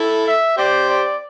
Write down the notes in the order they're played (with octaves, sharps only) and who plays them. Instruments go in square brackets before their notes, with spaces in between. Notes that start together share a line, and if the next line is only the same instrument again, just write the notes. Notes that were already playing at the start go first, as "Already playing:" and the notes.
Already playing: [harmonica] E4 A4
[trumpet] E5
[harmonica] G4 C5 [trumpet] D5
[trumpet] D5